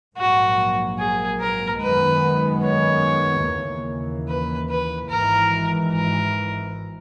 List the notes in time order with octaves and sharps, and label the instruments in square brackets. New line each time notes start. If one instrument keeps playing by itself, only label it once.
[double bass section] A#1 G#2 F#3 A#3 [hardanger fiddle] F#4
[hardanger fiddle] G#4
A#4
[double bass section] F#2 D#3 G#3 B3 [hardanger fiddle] B4
[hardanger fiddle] C#5
[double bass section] D#2 C#3 E3 A#3
[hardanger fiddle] B4
B4
[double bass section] G#1 G#2 E3 [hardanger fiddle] A#4
[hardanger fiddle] A#4